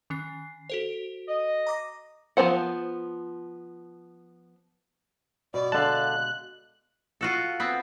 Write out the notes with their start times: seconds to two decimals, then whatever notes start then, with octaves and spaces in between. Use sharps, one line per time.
0.10 D#3 C#4 C7
0.70 F#4 A4 C5
1.28 D#5
1.67 A#5 D6 A#6
2.37 F3 F#3 B3 C5 F#5
5.54 B2 D5
5.72 D3 G#3 F5 A5 F#6
7.21 F4 F#4 A4
7.60 B3 C4